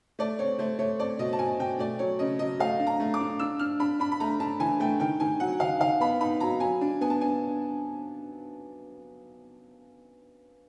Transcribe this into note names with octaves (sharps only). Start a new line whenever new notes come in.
A3 D5
C4 C#5
A3 C5
A3 C#5
C4 D5
B2 D#5
A5
B2 G#5
B2 G5
A3 D5
F#3 C#5
C#3 D#5
F#3 D#5
A3 F5
D4
A#5
A3
D6
D4
D4 E6
D4 F6
D4 B5
D4 B5
B5
A3 A#5
D4 A5
E3 G#5
A3 G5
D#3 G5
D#3 G#5
F#3 F#5
D#3 F5
D#3 F5
B3 B5
D#4 B5
F#3 A#5
F#3 G#5
D4
B3 G#5
A5
D4 G#5